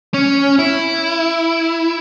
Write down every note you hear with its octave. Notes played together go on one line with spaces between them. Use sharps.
C#4
E4